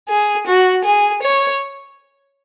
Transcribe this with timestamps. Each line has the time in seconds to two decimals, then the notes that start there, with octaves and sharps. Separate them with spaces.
0.09 G#4
0.47 F#4
0.84 G#4
1.23 C#5